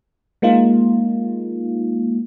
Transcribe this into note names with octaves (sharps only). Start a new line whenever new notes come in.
G#3 A#3 D#4 F4